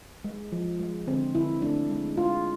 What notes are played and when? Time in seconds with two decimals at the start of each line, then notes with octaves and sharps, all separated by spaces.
0.24 G#3
0.52 F3
0.79 G#3
1.07 D3 C4
1.35 D3 E4
1.62 A3 D4
1.90 G#3
2.17 G#3 F4